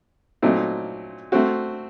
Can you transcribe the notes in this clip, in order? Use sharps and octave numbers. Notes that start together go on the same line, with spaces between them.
A#2 F#3 A3 C4 D#4
A3 C4 F#4